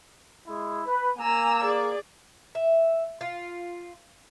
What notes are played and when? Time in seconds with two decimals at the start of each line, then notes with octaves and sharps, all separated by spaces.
0.47 G#3 E4
0.86 B4
1.17 A#3 G#5 A#5 E6
1.62 G#4 D5
2.55 E5
3.21 F4